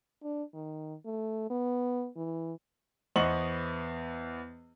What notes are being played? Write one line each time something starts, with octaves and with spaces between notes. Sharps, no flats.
D4
D#3
A3
B3
E3
E2 B3 C5 D#5 C#6 F#7